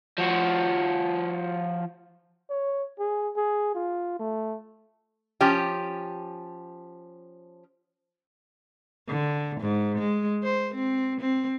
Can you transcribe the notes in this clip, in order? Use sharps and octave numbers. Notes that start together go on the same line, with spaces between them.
F3 F#4
C#5
G#4
G#4
F4
A3
F3 C#4 G4
D3
G#2
G#3
C5
C4
C4